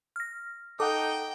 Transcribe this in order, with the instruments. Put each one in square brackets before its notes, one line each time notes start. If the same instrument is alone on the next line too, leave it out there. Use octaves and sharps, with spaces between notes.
[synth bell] F6 A#6
[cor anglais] D#4 [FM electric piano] A4 F#5 [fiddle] G5 [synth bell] D6